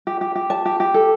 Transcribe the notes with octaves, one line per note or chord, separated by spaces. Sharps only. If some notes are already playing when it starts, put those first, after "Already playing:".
G4
G4
G4
A5
G4
G4
A4